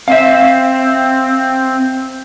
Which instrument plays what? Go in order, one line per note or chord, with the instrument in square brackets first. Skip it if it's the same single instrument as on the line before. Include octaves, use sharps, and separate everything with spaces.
[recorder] C4 [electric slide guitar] E5 F5